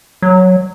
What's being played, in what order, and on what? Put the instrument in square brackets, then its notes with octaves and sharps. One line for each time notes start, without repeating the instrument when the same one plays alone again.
[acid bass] F#3